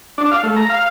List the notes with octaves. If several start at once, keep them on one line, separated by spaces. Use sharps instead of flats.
D4
F5
A3
A#5
F5